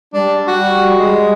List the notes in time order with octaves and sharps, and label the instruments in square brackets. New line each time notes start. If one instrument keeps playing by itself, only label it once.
[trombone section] G3 [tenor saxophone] D4
[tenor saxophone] F#4
G#3